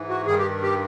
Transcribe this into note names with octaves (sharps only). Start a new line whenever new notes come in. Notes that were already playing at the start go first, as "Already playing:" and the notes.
Already playing: G#2 E3
F#4
G2 D#3 G#4
G4
G4